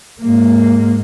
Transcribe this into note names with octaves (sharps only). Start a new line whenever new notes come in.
G#2 A#3